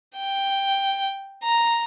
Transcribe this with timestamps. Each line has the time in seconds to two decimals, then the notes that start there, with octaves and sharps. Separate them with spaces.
0.17 G5
1.44 A#5